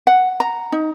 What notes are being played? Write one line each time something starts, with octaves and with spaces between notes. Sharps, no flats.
F#5
A#5
D#4